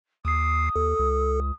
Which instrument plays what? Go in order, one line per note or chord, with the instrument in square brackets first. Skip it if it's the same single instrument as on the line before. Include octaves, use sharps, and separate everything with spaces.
[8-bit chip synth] D#2 C7 [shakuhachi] D#6
[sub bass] D#2 [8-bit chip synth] A4
[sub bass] C#2